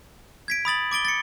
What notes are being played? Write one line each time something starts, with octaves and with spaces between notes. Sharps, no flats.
G#6 B6 D7
B5 D#6 A6 F#7
D6 A6 D7 G7
A6 C#7